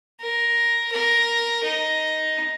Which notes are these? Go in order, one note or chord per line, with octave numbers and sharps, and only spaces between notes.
A#4
A#4
D#4